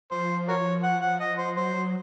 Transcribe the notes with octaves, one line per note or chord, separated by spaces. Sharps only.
F3 C5
F#4 A#4 C#5
F#5
F#5
D#5
C5
F#3 C5